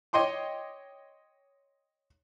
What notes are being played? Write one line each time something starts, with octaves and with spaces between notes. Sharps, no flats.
C#5 D#5 G5 C6 D6